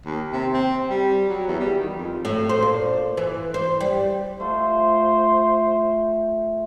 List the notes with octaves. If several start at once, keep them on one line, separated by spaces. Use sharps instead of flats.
D#2
C3
C4
G3
F#3
E2
G3
D#3
F2
A2
C5
A#2
E3
C5
G3
A3 F4 C5